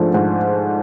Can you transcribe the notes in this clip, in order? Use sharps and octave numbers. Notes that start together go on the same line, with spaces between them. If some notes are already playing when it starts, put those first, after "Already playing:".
Already playing: G#2 F3 A3 D4
G#2